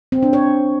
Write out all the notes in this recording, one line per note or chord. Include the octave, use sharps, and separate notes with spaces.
C4
D4
C#5